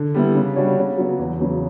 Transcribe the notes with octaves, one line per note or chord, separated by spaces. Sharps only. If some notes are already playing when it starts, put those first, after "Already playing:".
Already playing: D3
G3 B3 E4
C#3
G3 D4 F#4 C#5
C#3
F#3 B3 F#4 C#5
E2
C#3 F#3 B3